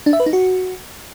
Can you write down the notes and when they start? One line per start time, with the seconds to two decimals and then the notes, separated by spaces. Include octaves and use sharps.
0.06 D4
0.13 E5
0.20 B4
0.26 D#4
0.33 F#4